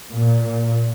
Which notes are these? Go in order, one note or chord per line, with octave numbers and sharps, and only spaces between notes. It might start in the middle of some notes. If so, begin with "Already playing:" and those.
A#2